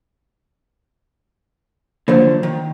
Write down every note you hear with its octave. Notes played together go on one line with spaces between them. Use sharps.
D3 F3 F#3 A#3 C5
D#3